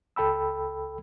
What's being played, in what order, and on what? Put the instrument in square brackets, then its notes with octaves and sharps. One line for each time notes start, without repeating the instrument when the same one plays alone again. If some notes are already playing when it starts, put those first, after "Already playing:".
[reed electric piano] C#2 A4 G5 B5 E6